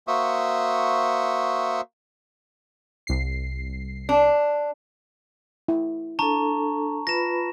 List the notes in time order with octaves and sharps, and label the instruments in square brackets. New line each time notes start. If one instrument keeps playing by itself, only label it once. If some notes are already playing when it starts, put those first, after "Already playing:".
[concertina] A#3 F#4 C5 E5 C#6 D#6
[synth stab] C2 C7
[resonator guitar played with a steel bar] D4
[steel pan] E4
[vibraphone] D4 A4 [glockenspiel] A5 A#5 C#6
[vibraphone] F4 B4 B5 [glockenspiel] A#6 E7